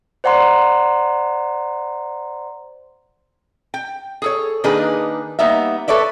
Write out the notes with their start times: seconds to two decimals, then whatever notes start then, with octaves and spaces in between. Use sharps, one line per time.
0.24 C5 D5 F#5 A#5 C6
3.74 G5
4.22 G#4 A4 C#5
4.64 D#3 A#3 D4 D#4 G#4 B4
5.39 G3 A#3 B3 D#4 E5
5.88 A4 B4 C#5 D5 E5